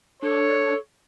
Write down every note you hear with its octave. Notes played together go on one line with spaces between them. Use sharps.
D4 A4 C#5